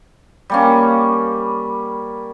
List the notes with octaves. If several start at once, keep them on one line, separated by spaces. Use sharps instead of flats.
G3 A#3 C#4